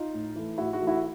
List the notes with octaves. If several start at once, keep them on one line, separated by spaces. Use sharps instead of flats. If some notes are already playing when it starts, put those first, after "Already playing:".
Already playing: D#4 F4
A2
E3 A3
A2 E4 F#4
E4 F#4
E3 A3
E4 F#4